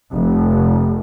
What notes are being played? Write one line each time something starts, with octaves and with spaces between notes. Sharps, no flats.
F1